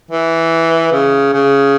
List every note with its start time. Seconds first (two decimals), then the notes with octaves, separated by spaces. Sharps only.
0.11 E3
0.92 C#3
1.33 C#3